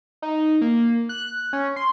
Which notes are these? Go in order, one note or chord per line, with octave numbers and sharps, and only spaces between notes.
D#4
A#3
F#6
C#4
C6